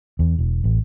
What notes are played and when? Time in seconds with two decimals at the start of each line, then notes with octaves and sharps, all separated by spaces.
0.19 E2
0.39 E1
0.64 A1